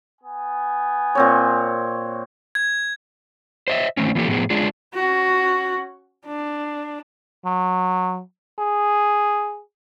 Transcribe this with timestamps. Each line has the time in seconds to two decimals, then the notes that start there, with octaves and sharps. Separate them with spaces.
0.22 B3 G#5
1.15 A#2 C4 C#5
2.55 G#6
3.68 C5 D#5 E5
3.97 D#3 A3 C4 C#4
4.15 E3 F3 A#3 G4 A4
4.28 A2 F3 B3 G#4
4.50 G#3 D4 F4 G#4
4.94 C#4 F#4
6.26 D4
7.45 F#3
8.59 G#4